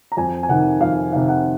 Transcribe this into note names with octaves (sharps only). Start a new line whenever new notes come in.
A#5
F2 G#5
G#5
C3 D#3 F#5
F2 F5
C3 D#3 F5
F#5